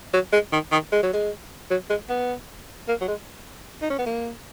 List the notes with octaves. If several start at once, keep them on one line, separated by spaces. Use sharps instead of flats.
F#3
G#3
D#3
D#3
G#3
F#3
G#3
F#3
G#3
B3
A#3
F#3
G#3
D#4
C#4
B3
A#3